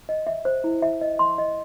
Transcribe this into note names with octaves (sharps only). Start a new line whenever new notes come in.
D#5
E5
C5
E4
E5
D#5
C6
D#5